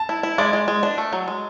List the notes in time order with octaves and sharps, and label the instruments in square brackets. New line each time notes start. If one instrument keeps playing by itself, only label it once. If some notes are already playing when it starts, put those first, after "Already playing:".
Already playing: [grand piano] A5
[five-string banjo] E4
E4
[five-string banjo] G#3 [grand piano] D5
[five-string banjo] G#3
G#3
D4
A3
F#3
G#3